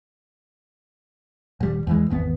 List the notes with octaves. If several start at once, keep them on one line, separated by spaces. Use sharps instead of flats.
D#1 G3
E2 E3 G#3
G#1 E2 B3